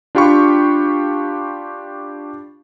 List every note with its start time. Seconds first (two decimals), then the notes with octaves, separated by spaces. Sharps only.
0.15 D4 F4 G4 F5 B5 C#6